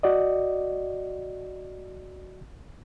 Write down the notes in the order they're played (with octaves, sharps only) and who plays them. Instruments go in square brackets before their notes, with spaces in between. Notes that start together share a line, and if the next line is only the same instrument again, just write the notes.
[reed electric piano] F#4 D5 D#5